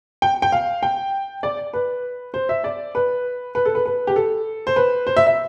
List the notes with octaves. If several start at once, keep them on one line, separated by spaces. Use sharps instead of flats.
G5
G5
F5
G5
D5
B4
C5
E5
D5
B4
B4
A4
B4
B4
G4
A4
C5
B4
C5
E5
E5